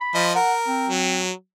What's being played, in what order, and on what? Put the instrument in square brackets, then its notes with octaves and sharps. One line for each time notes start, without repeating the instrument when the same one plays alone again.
[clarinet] B5
[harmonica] F3 D#5
[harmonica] A#4 [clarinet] F#5
[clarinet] C4
[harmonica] F#3